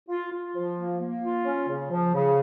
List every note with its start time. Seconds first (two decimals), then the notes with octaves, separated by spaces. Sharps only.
0.09 F4
0.32 F4
0.55 F3
0.77 A#3
1.01 A#3
1.22 F4
1.45 C#4
1.68 C#3
1.91 F3
2.14 C#3